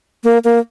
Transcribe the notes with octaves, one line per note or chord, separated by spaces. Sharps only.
A#3
A#3